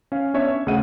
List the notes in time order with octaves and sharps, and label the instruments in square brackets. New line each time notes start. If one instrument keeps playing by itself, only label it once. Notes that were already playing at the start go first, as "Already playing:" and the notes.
[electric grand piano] C#4 F5
B3 C#4 D4 C#5 D5 E5
E5
D2 C#3 D#5 F#5 D#7